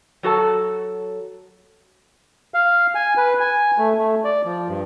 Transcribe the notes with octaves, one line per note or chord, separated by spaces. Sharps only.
F#3 F#4 A4 A5
F5
G#5
B4
G#5
A3
A3
D5
F3
G2